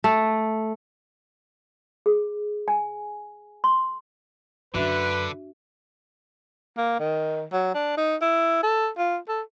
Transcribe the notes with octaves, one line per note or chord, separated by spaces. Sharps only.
A3
G#4
G#5
C6
F#2 D3 D4 F#4 B4 E5
A#3
D#3
F#3
D4
D#4
E4
A4
F4
A4